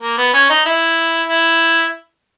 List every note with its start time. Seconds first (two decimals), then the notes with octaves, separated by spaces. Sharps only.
0.02 A#3
0.17 B3
0.34 C#4
0.50 D#4
0.66 E4
1.28 E4